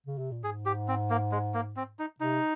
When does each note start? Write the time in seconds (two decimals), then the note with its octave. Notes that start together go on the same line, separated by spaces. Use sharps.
0.06 C#3
0.18 C3
0.32 A#2
0.44 G#2 G#4
0.66 G4
0.88 C4
1.10 A#3
1.32 G#3
1.54 A#3
1.76 C4
1.99 D#4
2.20 C3 D#4